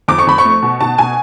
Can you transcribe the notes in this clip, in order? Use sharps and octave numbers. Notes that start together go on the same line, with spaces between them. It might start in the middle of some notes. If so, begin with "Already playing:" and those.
F2 D6
C#6
F2 B5
C#6
A3
B2
B2 A5
B2 G#5